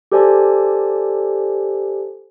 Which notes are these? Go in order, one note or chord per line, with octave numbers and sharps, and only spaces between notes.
G4 A4 C5 D5 G#5